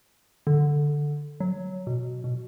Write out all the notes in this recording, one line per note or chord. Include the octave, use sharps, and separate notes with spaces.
D3
F#3
B2
B2